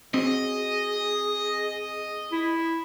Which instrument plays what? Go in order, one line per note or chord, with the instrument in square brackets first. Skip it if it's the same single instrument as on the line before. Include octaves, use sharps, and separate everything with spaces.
[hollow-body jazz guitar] C4 F#4 C#5 [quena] G#4 [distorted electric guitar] D#5
[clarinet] E4